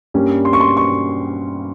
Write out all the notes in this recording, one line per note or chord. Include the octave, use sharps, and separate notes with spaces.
G2 G3 A#3 C#4
C6
C#6
C6
C#6